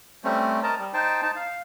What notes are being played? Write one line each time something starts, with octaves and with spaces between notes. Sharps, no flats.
G3 A3 C4 C#4
A#4 D#5 A5 A#5
G3
D#4 C5 G5 A5
D#4 A5
F5